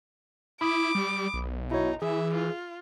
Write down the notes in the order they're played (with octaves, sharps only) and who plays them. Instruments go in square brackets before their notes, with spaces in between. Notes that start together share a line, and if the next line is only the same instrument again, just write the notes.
[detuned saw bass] E4 [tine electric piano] B5 D#6 [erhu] D6
[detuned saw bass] G3
B1
[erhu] D#4 [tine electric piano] E4 F#4 C#5
[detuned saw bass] E3 [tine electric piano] G#4 [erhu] E5
[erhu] F4